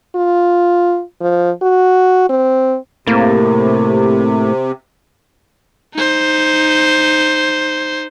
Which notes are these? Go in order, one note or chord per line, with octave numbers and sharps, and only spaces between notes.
F4
F3
F#4
C4
A2 C3 A#3
D#4 C5